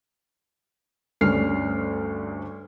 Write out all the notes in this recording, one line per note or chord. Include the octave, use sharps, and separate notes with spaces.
D2 G2 C#4 D4 F6 C7